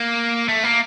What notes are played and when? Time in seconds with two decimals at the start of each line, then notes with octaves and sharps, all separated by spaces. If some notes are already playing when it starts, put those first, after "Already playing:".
Already playing: A#3
0.49 A3
0.64 A#3